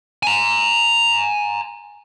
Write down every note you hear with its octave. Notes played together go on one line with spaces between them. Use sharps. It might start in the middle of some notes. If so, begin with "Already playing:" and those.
G#5 A#5